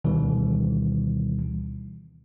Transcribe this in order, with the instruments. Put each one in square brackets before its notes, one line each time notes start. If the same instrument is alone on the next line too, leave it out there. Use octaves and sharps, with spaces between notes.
[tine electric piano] D2 B2 D#3 E3 G3